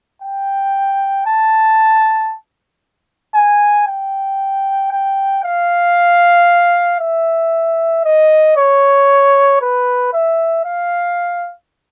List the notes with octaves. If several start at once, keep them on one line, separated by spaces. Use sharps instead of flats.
G5
A5
G#5
G5
G5
F5
E5
D#5
C#5
B4
E5
F5